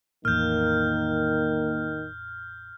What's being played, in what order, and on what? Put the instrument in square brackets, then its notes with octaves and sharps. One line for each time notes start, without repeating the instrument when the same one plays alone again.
[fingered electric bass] A1 E2 [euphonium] D#3 [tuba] A#3 [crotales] F6 G6